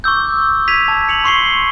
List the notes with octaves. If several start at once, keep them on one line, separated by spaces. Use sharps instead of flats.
C#6 D6 E6 G6
G#6 B6 D#7 F7
A5
C#7 F7 F#7
C6 C#6 C7 G7